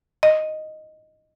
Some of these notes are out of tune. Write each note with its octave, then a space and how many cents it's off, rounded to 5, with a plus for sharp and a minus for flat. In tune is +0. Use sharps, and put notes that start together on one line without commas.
D#5 -5